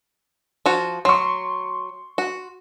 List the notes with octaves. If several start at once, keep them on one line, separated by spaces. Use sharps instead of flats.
F3 F#4
F#3 C6 C#6
F#4